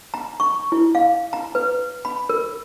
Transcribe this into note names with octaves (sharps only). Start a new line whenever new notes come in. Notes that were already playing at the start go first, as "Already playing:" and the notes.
A#5
C#6
E4
F5
A#5
B4
B5
A#4